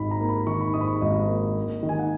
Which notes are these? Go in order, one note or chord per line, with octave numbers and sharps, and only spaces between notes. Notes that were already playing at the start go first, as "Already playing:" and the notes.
Already playing: G#1 G#2 D#3 B5
A#5
A#3
B5
D#3 C#6
B5
G#2 D#6
B5
C#6
G#1 D#5
A#3
A#3
D#3
G#5
F#5